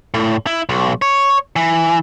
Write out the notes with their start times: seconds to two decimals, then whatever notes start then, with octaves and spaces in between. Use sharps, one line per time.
0.14 A2
0.47 E4
0.69 B1
1.02 C#5
1.56 E3